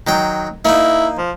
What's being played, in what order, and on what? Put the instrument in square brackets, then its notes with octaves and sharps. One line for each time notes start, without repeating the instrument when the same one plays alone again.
[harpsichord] D#3 F#3 G5
[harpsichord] A#3 D#4 [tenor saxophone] E4
[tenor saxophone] F3